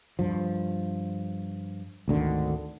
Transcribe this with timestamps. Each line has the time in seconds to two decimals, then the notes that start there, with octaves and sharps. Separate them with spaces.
0.19 G2 F3
2.08 G#1 D2 D3 D#3